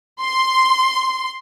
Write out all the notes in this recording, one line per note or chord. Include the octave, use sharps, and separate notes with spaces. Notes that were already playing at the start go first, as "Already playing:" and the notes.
C6